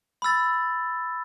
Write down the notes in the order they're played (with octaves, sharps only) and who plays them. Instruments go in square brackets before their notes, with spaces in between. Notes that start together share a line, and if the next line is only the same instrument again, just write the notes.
[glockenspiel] B5 E6 A6